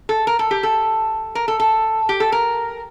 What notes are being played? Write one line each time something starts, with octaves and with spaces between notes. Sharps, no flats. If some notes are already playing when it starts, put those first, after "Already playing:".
A4
A#4
A4
G4
A4
A#4
A4
A4
G4
A4
A#4